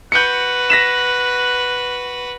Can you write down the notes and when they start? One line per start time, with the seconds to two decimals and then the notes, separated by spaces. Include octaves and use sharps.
0.12 F#4 B4 F#6 G6 C#7
0.70 A#6 B6 E7